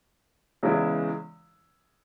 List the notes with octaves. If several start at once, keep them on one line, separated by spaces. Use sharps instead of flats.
E2 C#3 E3 G#3 E4